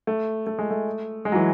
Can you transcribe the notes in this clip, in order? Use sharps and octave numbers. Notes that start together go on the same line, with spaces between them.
A3
A3
G#3
A3
G#3
F#3
E3